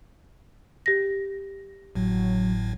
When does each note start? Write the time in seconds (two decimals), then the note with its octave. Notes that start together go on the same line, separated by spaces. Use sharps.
0.86 G4 A#6
1.95 G#1 A2 F#3